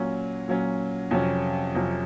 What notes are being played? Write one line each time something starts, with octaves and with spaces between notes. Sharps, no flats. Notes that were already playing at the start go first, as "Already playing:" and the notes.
Already playing: A#2 F#3 C#4
A#2 F#3 C#4
F2 C3 F#3 C#4
F2 C3 F#3 C#4